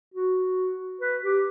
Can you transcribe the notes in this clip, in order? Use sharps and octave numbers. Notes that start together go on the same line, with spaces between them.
F#4
B4
G4